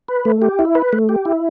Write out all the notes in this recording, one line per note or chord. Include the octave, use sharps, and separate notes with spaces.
B4
A3
G4
E4
B4
A3
G4
E4